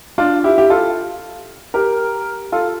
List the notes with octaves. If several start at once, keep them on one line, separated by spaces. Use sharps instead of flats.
D4 F4
E4 G4
G4
F4 A4
G4 A#4
F4 A4